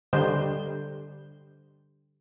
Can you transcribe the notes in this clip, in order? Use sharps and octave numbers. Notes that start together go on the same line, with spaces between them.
D3 G3 C5